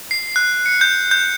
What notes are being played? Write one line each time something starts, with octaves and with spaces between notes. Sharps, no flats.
C7
F#6
C#7
G6
G6